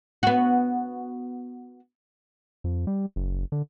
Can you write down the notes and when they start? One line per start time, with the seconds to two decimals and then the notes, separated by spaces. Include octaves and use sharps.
0.23 B3 F#4
2.64 F2
2.87 G3
3.16 F#1
3.52 D3